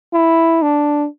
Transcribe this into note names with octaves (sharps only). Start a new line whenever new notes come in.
E4
D4